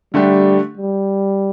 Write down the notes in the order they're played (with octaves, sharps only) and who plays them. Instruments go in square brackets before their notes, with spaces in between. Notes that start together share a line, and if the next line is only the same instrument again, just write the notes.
[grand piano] D3 A3 D4 G4 [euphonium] G3
[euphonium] G3